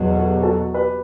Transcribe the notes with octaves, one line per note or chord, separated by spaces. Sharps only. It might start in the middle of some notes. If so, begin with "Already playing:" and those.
Already playing: E2 B2 F#3
A4
G4
F#4 A4
G4 B4